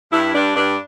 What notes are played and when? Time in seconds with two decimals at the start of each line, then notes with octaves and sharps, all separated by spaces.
0.12 G2 E4
0.34 G2 D4
0.56 G2 D4